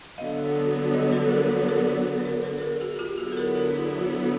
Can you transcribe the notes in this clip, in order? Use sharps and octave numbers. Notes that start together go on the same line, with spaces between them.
D3 F#3 B3 D#5 F5
C#5 D#5
A4 B4
G#4 A#4
G#4 A#4
C5 D5
B4
A#4 C5
A4 B4
B4
G#4 A#4
F#4 G#4
G#4
F4 G4
D3 F#3 B3 E4 F#4 G#4
A4
G#4 A#4
G#4 A#4